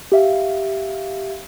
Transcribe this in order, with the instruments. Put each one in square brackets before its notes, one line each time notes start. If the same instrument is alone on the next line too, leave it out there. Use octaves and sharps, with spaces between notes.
[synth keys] G4 E5 F5